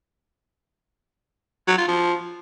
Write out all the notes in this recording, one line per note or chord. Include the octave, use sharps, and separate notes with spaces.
F#3
F4
F3